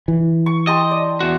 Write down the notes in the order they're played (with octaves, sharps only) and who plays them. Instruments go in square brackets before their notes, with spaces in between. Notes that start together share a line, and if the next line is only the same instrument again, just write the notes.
[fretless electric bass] E3
[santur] C#6
[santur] G4 A5 C6 [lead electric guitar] D#5
[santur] D5
[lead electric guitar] E2 F#4